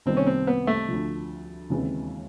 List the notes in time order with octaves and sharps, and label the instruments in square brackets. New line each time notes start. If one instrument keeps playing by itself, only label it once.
[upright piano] C2 C3 D#3 G3 B3 [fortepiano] C4
[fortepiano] C#4
C4
B3
A3
[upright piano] D2 D3 F3
D#2 C#3 E3 G#3 C4